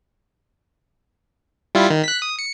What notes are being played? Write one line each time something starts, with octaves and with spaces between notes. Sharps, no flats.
G3 E4 F4
D#3
F#6 B6
D#6
C#7